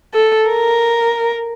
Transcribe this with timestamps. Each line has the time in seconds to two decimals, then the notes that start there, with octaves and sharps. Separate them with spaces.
0.14 A4
0.49 A#4